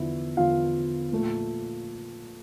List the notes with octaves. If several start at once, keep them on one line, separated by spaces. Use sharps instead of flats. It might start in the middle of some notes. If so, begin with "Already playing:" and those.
Already playing: E2 D3 F3 E4
E2 D3 F3 F4 F5
A#2 F3 A3